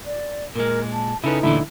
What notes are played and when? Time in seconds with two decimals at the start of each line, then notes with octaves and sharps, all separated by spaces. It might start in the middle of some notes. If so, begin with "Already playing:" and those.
0.06 D5
0.56 A#2 G#3 A#4
0.93 A5
1.24 C#3 C#4 D#4 E4 A4 B4
1.43 D2 A#2 D3 E3 E4